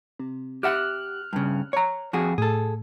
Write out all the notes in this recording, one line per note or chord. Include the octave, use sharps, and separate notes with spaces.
C3
G4 E5 F#5 F6 F#6
G2 C#3
C#5 A#5
F2 F#4 G#4
A2 G#4 A4